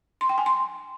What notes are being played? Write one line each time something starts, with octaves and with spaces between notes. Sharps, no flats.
C6
G5
G#5
C6